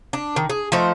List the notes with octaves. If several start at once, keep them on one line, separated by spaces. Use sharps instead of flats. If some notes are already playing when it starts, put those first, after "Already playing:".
D4
D#3
G#4
F3 A3 D#4 C5